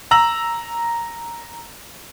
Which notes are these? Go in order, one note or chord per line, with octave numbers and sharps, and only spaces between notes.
A#5 E6 A#6 F#7